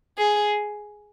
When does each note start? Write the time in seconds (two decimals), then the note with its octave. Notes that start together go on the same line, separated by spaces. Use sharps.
0.18 G#4